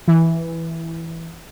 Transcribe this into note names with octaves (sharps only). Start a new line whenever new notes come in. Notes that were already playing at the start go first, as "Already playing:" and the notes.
E3